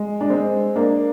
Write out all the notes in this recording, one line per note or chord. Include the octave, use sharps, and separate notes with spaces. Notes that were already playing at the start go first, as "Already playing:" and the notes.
Already playing: G#3
D4
G#3 C4
A#3 D4